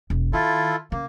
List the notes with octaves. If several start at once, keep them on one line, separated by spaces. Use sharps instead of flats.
E1
D#3 E4 F4 A4
C#3 A#3